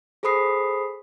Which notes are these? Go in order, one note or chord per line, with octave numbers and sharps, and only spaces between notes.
G#4 A4 C5 B5 D#6 C7